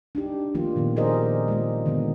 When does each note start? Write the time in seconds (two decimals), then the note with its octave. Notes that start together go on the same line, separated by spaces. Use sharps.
0.15 D4 D#4 G4
0.55 D#3 F3 A3 A#3 F4
0.76 A#2 D#3 B3
0.96 G4 G#4 A#4 C5 D5 D#5
1.48 G#3 A#3 F4
1.86 D3 D#3 F3 B3